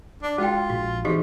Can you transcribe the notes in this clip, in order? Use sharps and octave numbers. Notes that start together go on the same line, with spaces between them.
D4
G#3 F4 F#4 G5
A#1 F#4
C3 E3 D#4 F#4 G#4